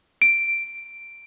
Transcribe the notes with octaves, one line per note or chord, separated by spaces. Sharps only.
D7